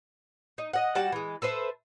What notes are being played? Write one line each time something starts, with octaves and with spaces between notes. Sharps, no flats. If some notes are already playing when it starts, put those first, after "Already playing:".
D#4
D#5 F#5
G3 F#4 A5
E3 G#3
A4 B4 C5 E5